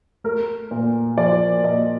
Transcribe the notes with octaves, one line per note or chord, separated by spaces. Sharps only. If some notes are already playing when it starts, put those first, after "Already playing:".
A3 A#4
A#2
F3 D5
A#2 D#5